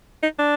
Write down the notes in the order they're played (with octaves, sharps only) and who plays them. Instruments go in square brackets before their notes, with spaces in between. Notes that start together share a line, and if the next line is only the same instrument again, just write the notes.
[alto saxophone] D#4
D4